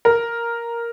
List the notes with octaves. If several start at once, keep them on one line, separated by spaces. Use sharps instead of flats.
A#4